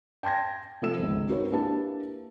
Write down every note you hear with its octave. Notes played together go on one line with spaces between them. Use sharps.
G5 A5 C6 G#6 A#6
C3 F3 A3 A4 E6 E7
G#1 C#2
C4 D#4 F#4 A#4 B4 C#5
A#3 D4 E4 G4 B4 A5